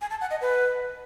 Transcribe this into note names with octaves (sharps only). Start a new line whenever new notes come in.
G#5
A5
F#5
D#5
B4